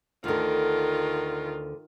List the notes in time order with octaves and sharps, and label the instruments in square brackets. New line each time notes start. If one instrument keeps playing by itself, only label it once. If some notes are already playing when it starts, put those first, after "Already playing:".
[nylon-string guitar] D2 D3 [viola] D#3 F4